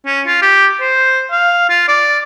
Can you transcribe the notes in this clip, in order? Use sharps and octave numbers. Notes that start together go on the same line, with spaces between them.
C#4
F4
G4
C5
F5
F4
D5